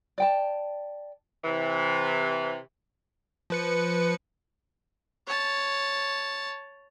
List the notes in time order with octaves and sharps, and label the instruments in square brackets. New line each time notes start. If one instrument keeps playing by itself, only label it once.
[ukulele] D5 G5 A5
[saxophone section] C3 E3
[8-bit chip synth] F3 B4 C#7
[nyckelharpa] C#5 A5